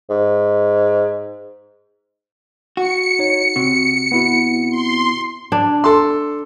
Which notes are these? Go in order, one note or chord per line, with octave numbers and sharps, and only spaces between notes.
G#2
F#4 C#7
D#4 C#5
C3 F#4
B3 E4 F#4
C6
D4
A4 C6